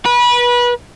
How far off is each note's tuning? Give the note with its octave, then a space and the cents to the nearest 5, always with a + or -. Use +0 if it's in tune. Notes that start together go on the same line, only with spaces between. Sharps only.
B4 -25